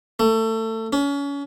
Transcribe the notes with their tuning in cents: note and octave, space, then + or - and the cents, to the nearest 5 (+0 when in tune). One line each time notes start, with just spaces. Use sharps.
A3 +25
C#4 +30